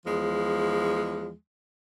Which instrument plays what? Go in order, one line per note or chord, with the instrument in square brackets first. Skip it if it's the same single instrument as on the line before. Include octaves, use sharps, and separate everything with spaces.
[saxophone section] E2 F3 G#3